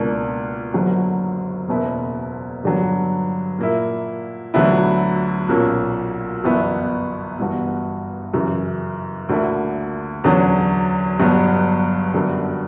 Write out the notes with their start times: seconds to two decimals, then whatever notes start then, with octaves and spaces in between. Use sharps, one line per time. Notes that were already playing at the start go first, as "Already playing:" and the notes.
Already playing: C#2 B2 A#3 D4
0.73 F#1 F#2 D3 F#3 B3
1.69 F#1 E2 B2 A#3 E4
2.64 G2 D3 F#3 B3
3.59 A#2 A#3 E4
4.54 D2 D3 F#3 B3 E4
5.49 B1 A#2 A#3 C#4
6.44 G1 F#2 E3 B3 E4
7.39 G1 G2 E3 B3 F#4
8.34 F#2 C#3 E3
9.29 D2 D3 A#3 E4
10.24 E2 D3 F#3 C#4
11.19 G1 G2 F#3 B3
12.14 F#2 D3 G3 B3